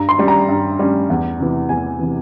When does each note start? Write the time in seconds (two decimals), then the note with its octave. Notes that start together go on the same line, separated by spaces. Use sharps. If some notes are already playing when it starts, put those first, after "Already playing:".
Already playing: G2 A#5
0.09 C6
0.18 G3 C#4
0.28 A#5
0.49 G2
0.79 G3 C#4
1.10 E2
1.40 C3 E3
1.69 E2 G#5
1.99 C3 E3